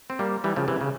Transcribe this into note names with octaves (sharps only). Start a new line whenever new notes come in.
C4
G3 A#3
E3 G3
C#3 F3
C3 E3
C#3